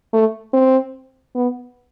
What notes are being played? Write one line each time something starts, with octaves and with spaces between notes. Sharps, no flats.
A3
C4
B3